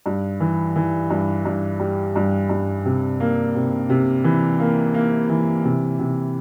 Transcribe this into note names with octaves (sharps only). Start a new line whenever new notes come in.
G2
E3
E3
G2
G2
G3
G2
G2
C3
A#3
C3
C3
E3
A#3
A#3
E3
C3
C3